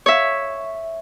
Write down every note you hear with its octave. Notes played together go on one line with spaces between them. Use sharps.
C#5 E5